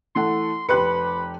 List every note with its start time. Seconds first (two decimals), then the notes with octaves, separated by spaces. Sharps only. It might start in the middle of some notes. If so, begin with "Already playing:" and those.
0.15 E3 A3 F#5 C6
0.69 F1 G4 B4 B5 C6 F#6 C#7